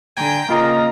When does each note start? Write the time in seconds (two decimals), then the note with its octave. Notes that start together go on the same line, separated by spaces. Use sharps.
0.17 D3 G5 G#5 A#5
0.49 C#3 A#3 F4 A#4 D#5 A#5